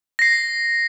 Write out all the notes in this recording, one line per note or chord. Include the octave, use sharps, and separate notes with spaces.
A#6 C7